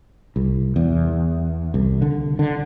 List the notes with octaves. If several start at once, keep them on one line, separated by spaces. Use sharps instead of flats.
C2
E2
C2
D3
D3